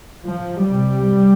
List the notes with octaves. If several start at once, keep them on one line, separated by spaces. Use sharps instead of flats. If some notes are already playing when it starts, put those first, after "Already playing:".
F3
C2 C3 G3